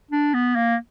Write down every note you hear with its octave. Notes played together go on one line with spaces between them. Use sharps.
D4
B3
A#3